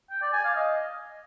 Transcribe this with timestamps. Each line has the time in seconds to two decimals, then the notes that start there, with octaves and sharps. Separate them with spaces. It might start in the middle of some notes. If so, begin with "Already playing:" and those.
0.11 G5
0.22 D5
0.33 G#5
0.44 F5
0.56 D#5